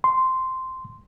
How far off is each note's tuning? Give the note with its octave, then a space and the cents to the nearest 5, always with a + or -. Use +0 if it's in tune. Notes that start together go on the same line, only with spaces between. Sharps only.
C6 -5